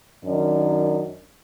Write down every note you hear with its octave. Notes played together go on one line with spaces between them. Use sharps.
F#2 D#3 C#4 D4 D#5